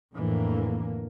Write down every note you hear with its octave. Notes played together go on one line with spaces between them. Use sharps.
F2 A2 D3 E3 A#3